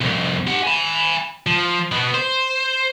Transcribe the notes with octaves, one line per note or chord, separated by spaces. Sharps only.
C2 F2
G4 F#5
G#5 B5
F3
B2 B3
C5